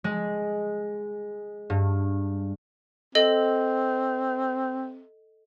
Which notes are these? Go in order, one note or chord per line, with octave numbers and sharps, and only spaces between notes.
G#3
G2
C4 A4 D#5